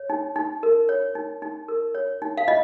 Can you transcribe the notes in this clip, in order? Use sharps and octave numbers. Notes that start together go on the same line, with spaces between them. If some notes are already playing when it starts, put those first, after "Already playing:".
Already playing: C#5
D#4
D#4
A#4
C#5
D#4
D#4
A#4
C#5
D#4
F5
F4 D#5